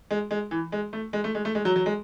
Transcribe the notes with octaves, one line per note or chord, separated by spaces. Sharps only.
G#3
G#3
E3
G#3
A3
G#3
A3
G#3
A3
G#3
F#3
F#3
G#3